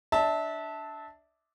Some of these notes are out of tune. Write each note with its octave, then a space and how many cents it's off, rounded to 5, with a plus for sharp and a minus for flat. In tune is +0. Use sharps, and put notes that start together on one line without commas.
D4 +0 E5 -25 A5 +0